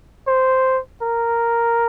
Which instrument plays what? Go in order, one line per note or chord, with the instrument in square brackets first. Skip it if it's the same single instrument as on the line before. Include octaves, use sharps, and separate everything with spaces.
[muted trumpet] C5
A#4